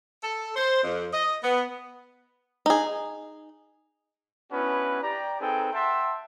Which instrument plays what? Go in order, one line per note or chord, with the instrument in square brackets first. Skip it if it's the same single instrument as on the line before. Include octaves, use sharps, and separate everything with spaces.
[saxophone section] A4
C5
F2
D#5
B3
[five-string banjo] D#4 G#4
[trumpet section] B3 C#4 D4 E4 F#4 B4
G4 D5 A#5
C4 D#4 G#4 A4 B4 G5
E5 F#5 G5 A5 C6